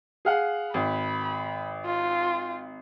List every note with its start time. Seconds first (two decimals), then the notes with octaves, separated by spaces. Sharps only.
0.25 G#4 F5 F#5
0.74 G#1 B5
1.85 F4